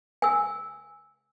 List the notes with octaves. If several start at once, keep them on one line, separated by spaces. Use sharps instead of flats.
G#5 E6